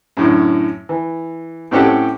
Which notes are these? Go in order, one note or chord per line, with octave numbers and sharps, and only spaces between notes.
F#2 A2 D3
E3
A2 C4 C#4 G4 A4 F#5